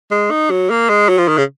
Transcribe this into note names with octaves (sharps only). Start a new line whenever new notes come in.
G#3
D#4
F#3
A#3
G#3
F#3
F3
D#3
C#3